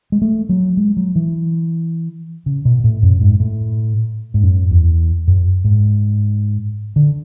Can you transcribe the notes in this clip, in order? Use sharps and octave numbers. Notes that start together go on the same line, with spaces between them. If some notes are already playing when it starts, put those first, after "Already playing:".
G#3
A3
F#3
G#3
F#3
E3
C#3
B2
A2
F#2
G#2
A2
G#2
F#2
E2
F#2
G#2
D3